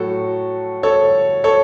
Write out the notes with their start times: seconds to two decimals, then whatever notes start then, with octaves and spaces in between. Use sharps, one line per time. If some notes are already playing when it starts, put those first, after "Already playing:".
Already playing: A2 F#3 F#4 A4
0.83 A4 C#5
1.44 A4 C#5